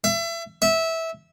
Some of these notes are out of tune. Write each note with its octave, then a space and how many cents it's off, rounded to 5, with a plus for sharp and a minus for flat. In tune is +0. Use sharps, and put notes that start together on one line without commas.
E5 +30
E5 -15